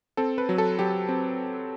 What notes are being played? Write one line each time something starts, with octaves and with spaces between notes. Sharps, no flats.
C4 A4
B4
F#3
A4
F#3 G4
C4